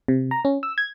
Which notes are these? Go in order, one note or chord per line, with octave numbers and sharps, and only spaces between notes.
C3
A#5
C#4
E6
G#6